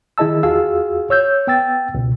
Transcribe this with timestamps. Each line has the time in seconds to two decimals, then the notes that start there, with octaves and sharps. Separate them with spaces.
0.18 D#3 E4 G#4 D#5 A5 E6
0.43 E2 F4 F#4 G#4 F5 E6
1.10 C#5 E6 G6
1.47 B3 G5 E6 A6
1.94 C#2 B2